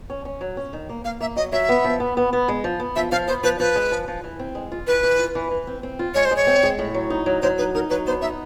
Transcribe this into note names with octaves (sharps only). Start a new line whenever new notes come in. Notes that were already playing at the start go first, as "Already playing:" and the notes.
C#4
C#4
F#3
C#4
D#3
A#3
A#3 F5
A#3 E5
F#3 D#5
F#3 E5
B3
F3
B3
B3
B3
G#3
F3
B3
F3 E5
F3 F5
B3 C5
F3 B4
F3 B4
G#3
F3
F3
E3
C4
G#3
F4
E3 B4
E3
F4
E3
E3
C4
C4
F4
G#3 C#5
C5
G#3
C#5
C4
G#3
A2
F#3
D#4
F#3
F#3 C5
D#4 B4
D#4 A#4
F#3 B4
B3 C5
D#4 E5